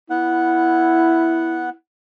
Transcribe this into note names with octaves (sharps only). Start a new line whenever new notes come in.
B3 E4 F#5